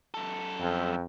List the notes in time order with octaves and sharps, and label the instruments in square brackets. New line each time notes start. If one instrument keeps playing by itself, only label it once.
[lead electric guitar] F#2 A4
[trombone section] F2